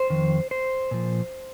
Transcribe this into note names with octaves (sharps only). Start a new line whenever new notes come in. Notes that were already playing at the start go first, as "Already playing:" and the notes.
Already playing: C5
F2 D#3
C5
A#2 F3